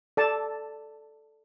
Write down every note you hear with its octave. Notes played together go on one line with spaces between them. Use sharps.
A4 D5 A5